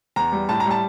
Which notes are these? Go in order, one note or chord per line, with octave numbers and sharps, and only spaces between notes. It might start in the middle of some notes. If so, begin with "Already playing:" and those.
E2 A#5
G3
A2 A5
A#5
G3
A5